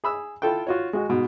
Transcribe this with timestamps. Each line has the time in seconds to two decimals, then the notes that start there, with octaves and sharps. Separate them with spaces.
0.04 G#4 B5 E6
0.42 E4 F4 A4 G5
0.67 F4 F#4 C#5
0.93 G#3 F#4
1.09 G#2 B2